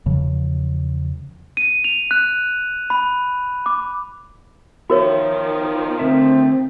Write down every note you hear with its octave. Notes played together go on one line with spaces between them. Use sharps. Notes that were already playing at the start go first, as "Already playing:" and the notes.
E2 C#3 F3
D#7
F7
F#6
B5
D6
D#3 F3 B3 F#4 A#4 C#5 E5
D3 A3 C4 E5